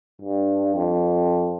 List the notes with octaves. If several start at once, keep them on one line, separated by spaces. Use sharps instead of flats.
G2
F2